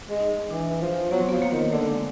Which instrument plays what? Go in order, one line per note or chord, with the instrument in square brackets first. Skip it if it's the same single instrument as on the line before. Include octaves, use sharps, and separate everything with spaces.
[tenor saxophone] G#3
[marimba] D#4
[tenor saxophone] E3 [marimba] D4
[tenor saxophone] F3
[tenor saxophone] F#3 [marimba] B3
[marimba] C4
B3
[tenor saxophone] F3
[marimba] A#3
[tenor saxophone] D#3
[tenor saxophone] D3 [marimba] A3
[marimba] G#3